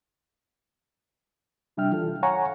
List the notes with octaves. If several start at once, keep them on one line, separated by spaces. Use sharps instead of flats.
C3 G3 D4 E5 G5 F6
E3 F4 A4
C#5 F5 F#5 G#5 A#5 C#6